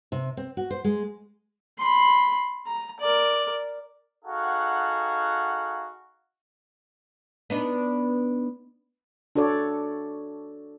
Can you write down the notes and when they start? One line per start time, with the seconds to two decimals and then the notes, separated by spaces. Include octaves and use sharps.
0.12 C3
0.37 C4
0.57 F#4
0.70 C5
0.84 G#3
1.78 B5 C6
2.67 A#5
3.00 A#4 D5
4.25 D#4 F#4 G#4 A4 F5 F#5
7.50 B3 D4 D#4
9.35 D4 F#4 A4 C#5 D5